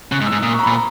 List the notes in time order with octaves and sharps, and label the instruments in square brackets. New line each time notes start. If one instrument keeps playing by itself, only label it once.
[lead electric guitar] C#3 [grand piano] F#6
[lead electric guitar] G#2
[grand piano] E6
[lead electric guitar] G#2
[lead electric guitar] A#2 [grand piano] D#6
[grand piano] C#6
A#5
B5
[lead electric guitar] A#2
[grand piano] A#5